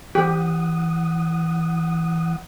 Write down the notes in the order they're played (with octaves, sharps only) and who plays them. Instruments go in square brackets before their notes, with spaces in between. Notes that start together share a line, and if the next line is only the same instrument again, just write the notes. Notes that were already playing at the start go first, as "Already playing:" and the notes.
[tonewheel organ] E3 F#5 D#6 [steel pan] G4